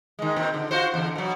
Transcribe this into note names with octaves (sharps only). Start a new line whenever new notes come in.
D#3 G#3
A#2 D#3 C4
D3
F4 F#4 C5
E2 D3
B2 F#3